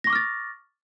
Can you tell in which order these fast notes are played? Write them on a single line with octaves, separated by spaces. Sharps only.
A#6 C#6 D6 F6 A6